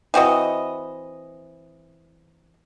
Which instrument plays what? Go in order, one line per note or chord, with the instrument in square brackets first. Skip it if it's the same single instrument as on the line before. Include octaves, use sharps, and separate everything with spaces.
[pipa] E3 C4 F#4 D#5